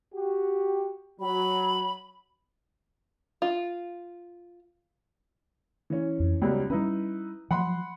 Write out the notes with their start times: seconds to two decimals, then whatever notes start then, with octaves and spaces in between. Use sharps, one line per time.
0.15 F#4 G4
1.20 F#3 B5
3.42 F4
5.90 E3 C#4
6.20 F2
6.42 C#2 F#3 G3 B3
6.70 G3 C#4 D#4 E4 B4
7.51 F3 F#3 F#5 B5 C6